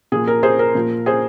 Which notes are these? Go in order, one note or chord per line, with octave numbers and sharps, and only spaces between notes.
A#2 F3 G#4
A#4
G#4 C5
A#4
A#2 F3
G#4 C5